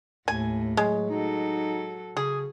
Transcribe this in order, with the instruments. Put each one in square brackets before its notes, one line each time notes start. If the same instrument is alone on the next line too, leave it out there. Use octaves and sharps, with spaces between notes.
[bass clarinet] D#2 [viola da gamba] A2 [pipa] G#5
[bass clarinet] F#3 [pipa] G#3
[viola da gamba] F#3 A4 [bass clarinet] D#4
[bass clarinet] C#3 [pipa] G#4